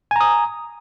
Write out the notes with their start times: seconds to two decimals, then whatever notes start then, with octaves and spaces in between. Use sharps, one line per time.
0.11 G#5
0.16 A#5
0.21 D#6